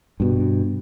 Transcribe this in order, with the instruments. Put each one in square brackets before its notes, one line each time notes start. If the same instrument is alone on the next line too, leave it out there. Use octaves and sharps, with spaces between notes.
[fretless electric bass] G2 B2